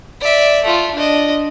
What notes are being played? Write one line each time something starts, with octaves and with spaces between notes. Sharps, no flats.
D5 E5
A3 F4
D4 D#5